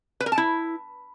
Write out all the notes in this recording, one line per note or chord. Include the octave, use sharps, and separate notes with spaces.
B4
A#4
A5
E4